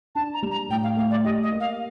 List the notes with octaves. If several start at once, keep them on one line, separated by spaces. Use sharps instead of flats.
D4 A5
A#5
G3
A#5
A2 G5
F5
A3 F5
D5
G4 D#5
D#5
A#3
F5